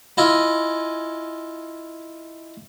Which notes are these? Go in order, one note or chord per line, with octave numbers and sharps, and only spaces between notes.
E4 F4 D#5 G#5